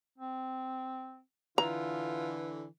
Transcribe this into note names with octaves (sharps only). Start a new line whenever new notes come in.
C4
D3 E3 F4 A#5